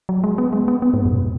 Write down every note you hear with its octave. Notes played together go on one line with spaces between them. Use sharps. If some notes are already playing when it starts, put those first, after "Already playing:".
F#3
G#3
B3
G#3
B3
B3
G#2
F#2
B2